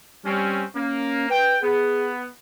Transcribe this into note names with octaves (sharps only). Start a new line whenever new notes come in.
G3 C4 C#4
A#3 C#4
B4 G5
B3 G#4